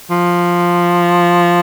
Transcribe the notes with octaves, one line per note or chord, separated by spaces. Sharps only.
F3